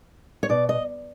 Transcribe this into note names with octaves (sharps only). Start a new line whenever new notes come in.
C#5
B2 D5
D#5